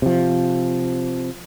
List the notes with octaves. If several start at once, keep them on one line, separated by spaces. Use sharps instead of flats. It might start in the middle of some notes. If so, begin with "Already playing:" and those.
C3 F3